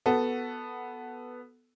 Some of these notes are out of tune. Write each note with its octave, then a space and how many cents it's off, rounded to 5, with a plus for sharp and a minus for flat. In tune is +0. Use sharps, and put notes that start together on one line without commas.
B3 +0 F#4 +10 A4 +0